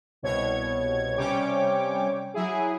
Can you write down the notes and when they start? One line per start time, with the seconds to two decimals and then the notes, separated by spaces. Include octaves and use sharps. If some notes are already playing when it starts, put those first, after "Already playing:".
0.22 C2 B2 C#5 G#6
1.17 C3 G3 C#4 C#5 G5 D6
2.34 F#3 E4 G#4